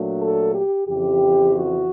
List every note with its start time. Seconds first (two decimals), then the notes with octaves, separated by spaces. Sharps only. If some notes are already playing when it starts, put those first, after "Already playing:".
Already playing: A#2 F#3 A3 D4
0.21 A4
0.54 G4
0.88 F2 C#3 E3 G4
1.54 F#4